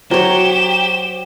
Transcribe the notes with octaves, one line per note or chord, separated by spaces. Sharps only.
F#3 G4 C5 C#5 E7